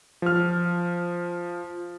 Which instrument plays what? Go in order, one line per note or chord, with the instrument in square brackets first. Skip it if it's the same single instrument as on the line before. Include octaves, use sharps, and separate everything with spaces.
[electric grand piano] F3 F6